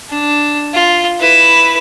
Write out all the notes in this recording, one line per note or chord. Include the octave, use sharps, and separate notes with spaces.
D4
F4
E4 B4